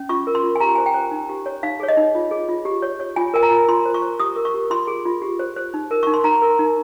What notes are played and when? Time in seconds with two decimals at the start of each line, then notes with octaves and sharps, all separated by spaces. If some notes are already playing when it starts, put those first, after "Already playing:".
Already playing: C#4
0.09 F4 C#6
0.27 A#4
0.35 C6
0.43 F4
0.56 G#5
0.60 G4 A#5
0.75 C5 G#5
0.86 G5
0.94 C5
1.12 D#4
1.29 G4
1.46 C#5
1.63 D#4 F5
1.80 G#4 C#5
1.88 D#5
1.97 D#4
2.15 F4
2.31 G#4
2.49 F4
2.65 G4
2.82 C#5
3.00 C#5
3.16 F4 G#5
3.34 A#4 G#5
3.43 A#5
3.51 F4
3.68 F4 C6
3.86 C5
3.94 C#6
4.02 C5
4.20 G4 D#6
4.36 A#4
4.45 C#6
4.54 G4
4.70 F4 C6
4.87 G#4
5.05 F4
5.22 G4
5.39 C5
5.56 C5
5.74 D#4
5.91 A#4
6.03 D#4 C#6
6.14 C6
6.24 D#4 A#5
6.42 A#4
6.59 D#4